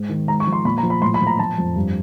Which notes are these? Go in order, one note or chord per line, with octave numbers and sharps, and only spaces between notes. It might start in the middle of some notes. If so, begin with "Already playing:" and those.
Already playing: G#2
D#3
G#2 A#5
C#6
F3
C6
A#2 B5
A#5
F3
B5
A2 C6
B5
F3
A#5
F3 A5
F2
G2